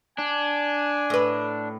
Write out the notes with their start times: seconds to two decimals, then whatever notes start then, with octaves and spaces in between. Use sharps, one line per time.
0.18 D4 G#5
1.10 A2 B4